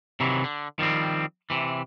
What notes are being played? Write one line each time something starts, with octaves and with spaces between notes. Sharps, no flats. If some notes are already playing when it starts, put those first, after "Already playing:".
C3 D#3 E3 F#3
D3
D#3 F3 G3 C4
C3 E3